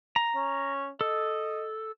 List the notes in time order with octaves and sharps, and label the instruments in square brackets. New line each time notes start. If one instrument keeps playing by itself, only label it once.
[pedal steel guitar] A#5
[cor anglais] C#4
[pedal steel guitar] A4 [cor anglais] D#5